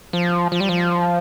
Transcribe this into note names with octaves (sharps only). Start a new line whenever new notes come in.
F3
F3
G3
F3